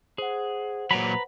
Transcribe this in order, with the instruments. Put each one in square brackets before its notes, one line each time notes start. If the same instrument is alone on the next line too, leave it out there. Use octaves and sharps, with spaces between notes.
[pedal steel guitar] G#4 [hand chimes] C5 F#5
[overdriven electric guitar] A#2 F#3 [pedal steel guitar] B4 A#5 B5